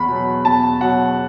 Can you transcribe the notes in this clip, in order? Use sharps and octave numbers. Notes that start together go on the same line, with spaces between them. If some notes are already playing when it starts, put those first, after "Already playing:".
Already playing: E2 B5
B2 F#3
E2 A5
B2 F#3 F#5